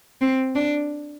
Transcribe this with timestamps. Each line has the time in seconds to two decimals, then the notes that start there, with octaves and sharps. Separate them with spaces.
0.21 C4
0.55 D4